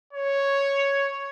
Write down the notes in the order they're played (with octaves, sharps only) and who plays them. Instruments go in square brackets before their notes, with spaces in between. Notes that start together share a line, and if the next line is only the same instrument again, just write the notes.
[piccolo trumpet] C#5